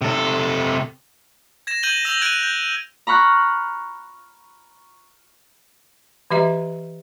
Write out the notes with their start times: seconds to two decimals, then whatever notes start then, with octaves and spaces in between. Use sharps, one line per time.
0.02 C3 A4
1.67 G#6 A#6 E7
1.83 G6 G#6 D#7 F#7 G7
2.05 E6 A#6 F7 G7
2.21 F#6 G#6 D7 D#7
2.43 G6
3.07 A#5 B5 C#6 F6 F#6
6.31 E3 G4 D#5 E5 A#5